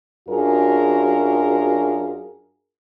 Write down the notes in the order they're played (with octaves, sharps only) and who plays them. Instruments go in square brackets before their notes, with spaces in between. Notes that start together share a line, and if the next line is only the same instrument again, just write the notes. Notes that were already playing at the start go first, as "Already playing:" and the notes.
[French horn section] F#2 D4 F4 F#4 G#4 A#4